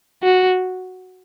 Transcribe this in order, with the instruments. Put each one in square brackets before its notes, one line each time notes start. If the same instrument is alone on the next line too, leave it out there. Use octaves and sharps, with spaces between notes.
[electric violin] F#4